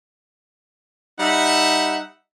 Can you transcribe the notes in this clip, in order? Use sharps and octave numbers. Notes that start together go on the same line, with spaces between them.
G3 D#4 E5 F#5